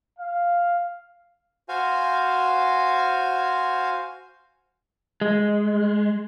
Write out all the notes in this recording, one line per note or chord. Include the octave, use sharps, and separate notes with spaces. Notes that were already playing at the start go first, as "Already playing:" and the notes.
F5
F#4 C5 F5 G#5
G#3